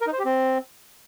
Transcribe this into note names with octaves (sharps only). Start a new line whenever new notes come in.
A#4
D#4
C5
G4
C4